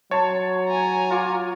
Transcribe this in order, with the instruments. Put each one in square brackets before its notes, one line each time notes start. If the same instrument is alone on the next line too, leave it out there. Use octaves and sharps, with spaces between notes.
[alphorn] F#3 [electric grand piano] C#5 [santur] A5 C6
[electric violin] G#5 A#5
[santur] F4 C#6 D6